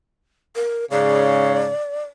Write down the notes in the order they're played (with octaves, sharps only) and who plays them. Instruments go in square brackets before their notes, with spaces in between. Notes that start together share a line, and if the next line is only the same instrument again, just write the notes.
[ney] A#4
[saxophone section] G#2 C#3 [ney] D5